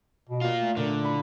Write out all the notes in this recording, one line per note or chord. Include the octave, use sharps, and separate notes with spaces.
B2
A#3 F4
A3
A#2 D3
E4 B5